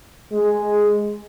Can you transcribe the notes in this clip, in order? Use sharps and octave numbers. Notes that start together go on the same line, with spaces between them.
G#3